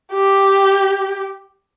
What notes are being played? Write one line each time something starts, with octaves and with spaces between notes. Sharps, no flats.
G4